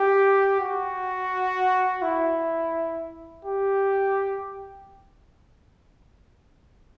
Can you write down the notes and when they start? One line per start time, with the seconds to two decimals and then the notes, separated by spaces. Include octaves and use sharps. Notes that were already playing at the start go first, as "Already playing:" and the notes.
Already playing: G4
0.60 F#4
2.02 E4
3.45 G4